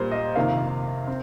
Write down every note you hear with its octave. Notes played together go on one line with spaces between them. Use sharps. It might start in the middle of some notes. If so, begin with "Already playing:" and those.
Already playing: A#2 G3 A#3 C5
D#5
F2 C3 D#3 A#3 F5
C4